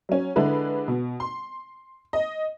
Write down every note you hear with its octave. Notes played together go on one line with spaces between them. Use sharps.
F#3 C#4
D3 G#3 D4 E4 B4
B2
C6
D#5